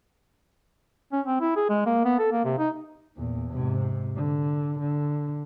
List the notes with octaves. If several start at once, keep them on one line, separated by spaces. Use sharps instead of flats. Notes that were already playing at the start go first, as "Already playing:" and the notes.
C#4
C4
E4
G#4
G#3
A#3
B3
A4
A#3
C3
D#4
E2 A#2
G#2 C3
D3
D3